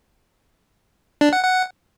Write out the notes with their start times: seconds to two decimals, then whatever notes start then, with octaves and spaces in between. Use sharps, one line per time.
1.21 D4
1.33 F#5
1.44 F#5